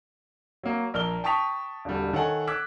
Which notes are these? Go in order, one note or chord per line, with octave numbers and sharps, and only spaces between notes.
F#3 A#3
A#1 A#4 F6 G7
G5 A5 C#6 D#6 B6 F7
E1 D3 G3
D#3 A4 C#5 F#5 G#5
D6 E6 F#6 G#6 B6